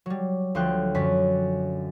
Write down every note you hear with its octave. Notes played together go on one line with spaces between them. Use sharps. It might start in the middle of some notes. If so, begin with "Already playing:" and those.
F#3 G3
D2 F3 F#3 G5 F#6
F#2 D3 C#4 B6